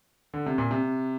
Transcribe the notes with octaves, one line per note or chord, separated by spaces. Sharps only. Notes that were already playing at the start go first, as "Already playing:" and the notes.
D3
C3
A#2
C3